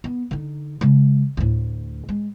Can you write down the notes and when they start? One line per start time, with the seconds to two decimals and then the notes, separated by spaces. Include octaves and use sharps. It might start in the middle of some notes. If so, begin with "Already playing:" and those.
0.04 B3
0.31 D3 D#4
0.81 C#3 G#3
1.37 D2 A2
2.09 G#3